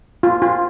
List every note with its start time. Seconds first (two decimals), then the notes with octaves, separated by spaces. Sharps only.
0.23 F4
0.42 F4